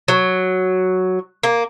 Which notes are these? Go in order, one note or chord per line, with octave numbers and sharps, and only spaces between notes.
F#3
A#3